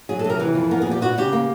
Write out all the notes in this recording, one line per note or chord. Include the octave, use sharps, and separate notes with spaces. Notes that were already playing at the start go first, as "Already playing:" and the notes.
F#3 G#4
A4
C3
A#4
E3 B4
F2
B3 A#4
G#4
A#2
G4
B3 F#4
C#3 G4
A#3